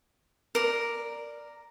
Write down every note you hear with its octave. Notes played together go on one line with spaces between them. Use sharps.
A#4 D5